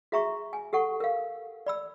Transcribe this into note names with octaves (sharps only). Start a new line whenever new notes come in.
F#4 G#4 E5 A#5 C6 C#6
G#5
G4 A4 F#5 C#6
A#4 F5
D5 B5 E6